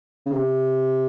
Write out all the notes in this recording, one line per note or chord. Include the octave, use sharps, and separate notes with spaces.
C#3
C3